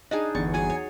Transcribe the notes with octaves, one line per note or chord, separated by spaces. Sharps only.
D4 D#4 G#4 D#5
G1 E2 C#6 A6
F#3 G#4 G#5
C#5